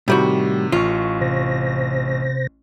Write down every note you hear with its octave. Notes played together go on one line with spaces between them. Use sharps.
A2 C3 D#3 G3 F#4
A1 F4 C#6
C3 C5 A#6